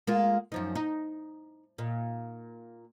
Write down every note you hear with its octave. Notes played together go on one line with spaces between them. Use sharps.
G#3 A#3 F4
F#2 F3 D#4
D#4
A#2 D#4